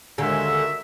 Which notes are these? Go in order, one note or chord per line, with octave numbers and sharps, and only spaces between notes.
D#2 D3 G#3 F#4 A#4 E5